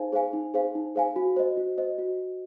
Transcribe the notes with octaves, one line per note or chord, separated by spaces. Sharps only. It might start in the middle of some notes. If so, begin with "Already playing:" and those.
Already playing: D#4 G#4 C5 F5 G#5
G#4 C5 F5 G#5
D#4
G#4 C5 F5 G#5
D#4
G#4 C5 F5 G#5
F#4
C5 D#5
F#4
C5 D#5
F#4